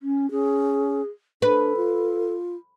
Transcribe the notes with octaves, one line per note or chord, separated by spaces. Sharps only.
C#4
C#4 G#4
D4 A4 B4
F4